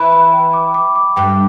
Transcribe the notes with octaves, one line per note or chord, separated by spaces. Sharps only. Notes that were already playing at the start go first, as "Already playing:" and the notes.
Already playing: E3 B5
B5
G5
D6
D6
D6
G2 G5